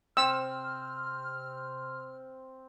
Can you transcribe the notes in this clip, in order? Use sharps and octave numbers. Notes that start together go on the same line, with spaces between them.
C3 C4 G5 E6 F6